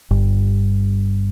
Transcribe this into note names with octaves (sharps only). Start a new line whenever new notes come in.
G1 G2